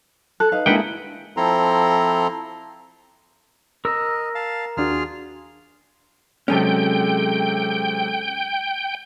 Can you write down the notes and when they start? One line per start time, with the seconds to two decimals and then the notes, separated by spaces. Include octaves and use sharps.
0.40 A4 F#6
0.52 D#4 B4 F5
0.66 G#3 A#3 D4 E4 G#4 B4 F#5 G5
1.37 F3 C4 E4 A4 A#5 C6
3.85 A#4 D#5 E6
4.35 F5 A5
4.77 D#2 D4 F4 F#4 G#4 F6
6.48 C3 F#3 G#3 C#4 G#4 A4 G5